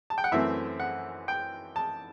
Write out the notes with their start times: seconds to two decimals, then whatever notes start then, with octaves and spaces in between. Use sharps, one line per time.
0.10 A5
0.18 G5
0.24 F#5
0.32 F#2 E3 A3 C4 E5
0.80 F#5
1.28 G5
1.76 A5